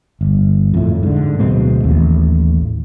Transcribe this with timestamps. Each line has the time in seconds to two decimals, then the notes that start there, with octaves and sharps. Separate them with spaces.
0.21 G1
0.74 F2 A2
1.03 G#2 D3
1.39 D1 B2 G#3 C4
1.84 A1 D#2